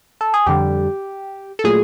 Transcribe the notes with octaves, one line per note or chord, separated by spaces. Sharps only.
A4
G#4
F2 D3 G3 G4
A4
A#2 F#3 A3 G#4